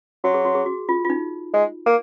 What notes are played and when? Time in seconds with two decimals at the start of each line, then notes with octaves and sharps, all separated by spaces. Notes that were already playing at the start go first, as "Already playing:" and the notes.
0.24 F#3 F#4
0.34 G#4
0.45 F#4
0.55 G#4
0.66 F#4
0.89 F4
1.05 F4
1.10 D#4
1.54 G#3
1.86 A#3